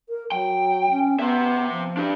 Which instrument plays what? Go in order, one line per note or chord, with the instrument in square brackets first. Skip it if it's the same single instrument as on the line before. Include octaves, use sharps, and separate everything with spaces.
[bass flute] A#4
[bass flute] F#3 [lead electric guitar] G5
[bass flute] C#4
[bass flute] B3 [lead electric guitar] C4 E5
[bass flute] F3
[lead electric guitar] D4 G4